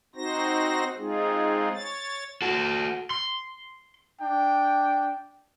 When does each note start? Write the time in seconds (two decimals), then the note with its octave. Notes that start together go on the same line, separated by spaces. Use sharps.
0.15 C4 D#4 F#4 C5 A#6
0.98 G#3 C4 D#4 F4 G#4
1.74 C#5 A6
2.42 F#4 A4
3.10 C6
4.21 D4 G5